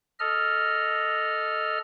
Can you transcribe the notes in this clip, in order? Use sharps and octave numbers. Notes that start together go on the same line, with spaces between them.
A4 D#5 F6